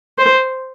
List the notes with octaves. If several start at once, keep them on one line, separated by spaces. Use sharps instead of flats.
C5